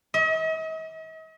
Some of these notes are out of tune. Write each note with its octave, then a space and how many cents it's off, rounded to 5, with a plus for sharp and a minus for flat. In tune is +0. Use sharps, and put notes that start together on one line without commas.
D#5 +45